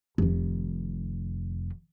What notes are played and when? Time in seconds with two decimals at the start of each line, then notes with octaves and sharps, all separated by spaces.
0.18 F1 D#3